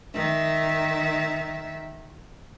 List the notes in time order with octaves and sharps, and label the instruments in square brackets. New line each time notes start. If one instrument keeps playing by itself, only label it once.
[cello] D#3 E5